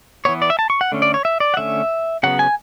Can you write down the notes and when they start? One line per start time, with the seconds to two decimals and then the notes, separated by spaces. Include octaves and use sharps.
0.25 E3 B3 C#5
0.42 D5
0.50 E5
0.59 A5
0.70 C#6
0.81 F#5
0.92 D3 A3 C#4
1.02 D5
1.14 C#5
1.25 E5
1.40 D5
1.54 F#5
1.57 D3 A3 C#4 E5
2.23 C#3 F#3 B3 F#5
2.39 G#5